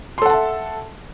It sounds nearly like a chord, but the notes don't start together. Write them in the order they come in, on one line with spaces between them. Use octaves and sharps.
C6 A4 F#5 A5 E5